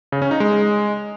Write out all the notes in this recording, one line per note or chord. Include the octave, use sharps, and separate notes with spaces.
C#3
C#4
D#4
G#3